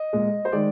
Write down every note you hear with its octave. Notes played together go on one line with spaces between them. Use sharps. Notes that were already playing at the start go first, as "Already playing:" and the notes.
Already playing: D#5
A#2 G#3
C5
D#3 G#3 D5